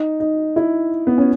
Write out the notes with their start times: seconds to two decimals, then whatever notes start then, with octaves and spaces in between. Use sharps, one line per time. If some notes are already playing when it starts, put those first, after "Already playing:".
Already playing: D#4
0.20 D#4
0.56 E4
1.07 B3
1.18 C#4